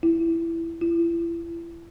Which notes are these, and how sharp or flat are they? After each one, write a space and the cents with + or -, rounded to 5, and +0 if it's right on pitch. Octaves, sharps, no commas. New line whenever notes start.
E4 +10
E4 +35